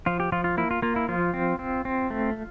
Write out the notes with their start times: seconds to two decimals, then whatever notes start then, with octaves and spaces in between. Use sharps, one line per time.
0.06 F3 F4
0.20 G4
0.32 F3 F4
0.44 F4
0.57 A#3 E4
0.71 F4
0.82 A#3 F4
0.96 E4
1.08 F3 F4
1.34 C4
1.59 C4
1.85 C4
2.10 A3